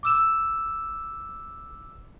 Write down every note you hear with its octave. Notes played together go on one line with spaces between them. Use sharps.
D6 E6 E7